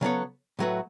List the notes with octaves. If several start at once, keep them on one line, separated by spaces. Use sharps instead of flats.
C#3 F#3 B3 A4 C#5
A2 F#3 A3 F#4 B4